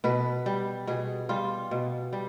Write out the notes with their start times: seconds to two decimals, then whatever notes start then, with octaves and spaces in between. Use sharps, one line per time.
0.04 B2 B4
0.46 G3
0.87 B2 G#4
1.29 G3 F4
1.71 B2
2.13 G3